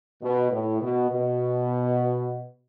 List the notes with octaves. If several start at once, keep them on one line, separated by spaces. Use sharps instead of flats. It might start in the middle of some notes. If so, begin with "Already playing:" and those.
B2
A2
B2
B2